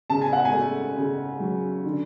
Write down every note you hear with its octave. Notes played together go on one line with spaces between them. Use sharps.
C#3 A5
G#5
F#5
G#5
A3
C#3
F#3
D3